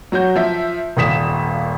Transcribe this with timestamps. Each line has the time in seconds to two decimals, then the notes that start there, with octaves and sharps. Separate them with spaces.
0.12 F#3 F#4 C#5 G6
0.36 F3 E5
0.97 D#1 G#1 D#6 B6 E7